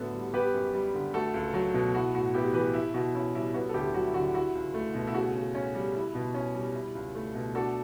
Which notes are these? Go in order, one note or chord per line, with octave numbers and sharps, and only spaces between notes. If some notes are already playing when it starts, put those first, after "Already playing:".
Already playing: A2 D3 B3 E4 F#4 A4
G3
B3 G4 B4
F#2
G3
D3
A3 F#4 A4
C#2
F#3
B2
E4 F#4
A2 F#4
B3 E4 G4
E3 G4 B4
E4
B2 F#4
C#4 E4
G3 E4
B3 F#4
A4
D2 E4 G4
F#3 F#4
E4
D3 F#4
E4 F#4
C#2
A3
B2
E4
C#3 F#4
C#3
C#4
G3
E4
B2
C#4
G3
E4
C#2
A3
B2
D4 F#4 A4